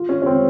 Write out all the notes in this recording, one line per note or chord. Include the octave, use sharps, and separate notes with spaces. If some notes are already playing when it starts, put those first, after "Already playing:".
Already playing: F4
C#4
C#4
C4